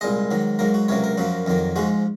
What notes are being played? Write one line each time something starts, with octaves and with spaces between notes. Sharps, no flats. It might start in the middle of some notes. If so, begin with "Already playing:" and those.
C2 A#2 G#3 D#5
G#2 D#3 F#3
G#2 F#3 A#3 A#4
F#4
C#2 C3 F#3 A#3 C#5
A#4
F#2 F3 A#3 F#4
F2 D#3 F#3 A#3
G#2 F3 G#3 F#4